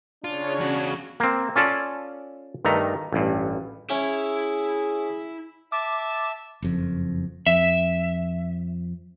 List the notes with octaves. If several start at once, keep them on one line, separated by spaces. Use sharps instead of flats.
C#3 D4 F4 C#5
E2 F#4
A#3 C4
C#4 F4 A4 D5 A5
G2 D#3 A3 A#5
A1 G2
C#4 E4 G#4 C#5 E5
E5 A5 D6
F#1 F2
F2 E5